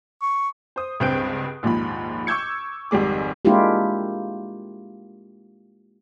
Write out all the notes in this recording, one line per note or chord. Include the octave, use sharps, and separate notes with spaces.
C#6
C5 D#6
C#2 G2 C4 F#6 G6 D7
A#1 D#2 G#2 F3 B5
C#6 D6 E6 G6 G#6 C#7
G#1 F2 G3 G#3 D6
G#3 A#3 D4 E4 F4 G4